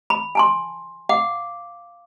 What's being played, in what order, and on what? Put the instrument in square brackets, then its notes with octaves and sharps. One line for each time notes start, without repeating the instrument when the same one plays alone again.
[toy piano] B5
G#5 A5 C6
[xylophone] F5 D6 [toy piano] F#5